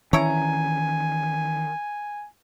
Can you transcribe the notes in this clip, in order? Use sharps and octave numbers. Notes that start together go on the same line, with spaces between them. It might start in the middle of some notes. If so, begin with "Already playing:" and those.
D#3 E3 C#4 E4 C#5 G#5 A#5